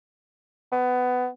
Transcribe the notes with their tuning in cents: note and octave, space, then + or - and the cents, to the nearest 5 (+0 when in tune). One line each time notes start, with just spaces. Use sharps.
B3 +20